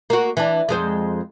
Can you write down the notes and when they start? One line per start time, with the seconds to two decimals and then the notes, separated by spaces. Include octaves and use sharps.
0.10 A#3 F#4
0.37 E3 D4
0.69 F2 G#3 C5